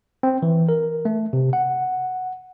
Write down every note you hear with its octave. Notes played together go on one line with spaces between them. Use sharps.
C4
E3
A#4
A3
C3
F#5